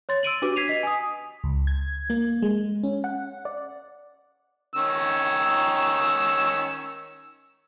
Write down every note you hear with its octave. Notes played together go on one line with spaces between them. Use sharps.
C#5 C6 A6
E6 D7 D#7 F#7
D4 F#4 G4 B4 D6 D#7
G#6 B6 C7 D#7 F7
D#5 B6
G#5 D#6
C#2
G#6
A#3
G#3
C#4
F#5
D5
D#3 C#4 E6